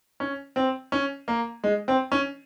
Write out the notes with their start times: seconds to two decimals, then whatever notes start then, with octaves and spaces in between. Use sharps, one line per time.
0.20 C#4
0.56 C4
0.92 C#4
1.28 A#3
1.64 G#3
1.88 C4
2.12 C#4